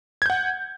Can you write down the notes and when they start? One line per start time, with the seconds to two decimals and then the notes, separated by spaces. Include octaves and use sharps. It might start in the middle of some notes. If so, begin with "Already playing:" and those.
0.22 G#6
0.26 G6
0.30 F#5